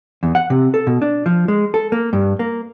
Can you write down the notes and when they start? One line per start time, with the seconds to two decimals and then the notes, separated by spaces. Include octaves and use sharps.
0.23 E2
0.35 F#5
0.50 C3
0.74 A4
0.87 B2
1.02 D4
1.26 F3
1.48 G#3
1.74 A4
1.92 A#3
2.13 G2
2.39 A#3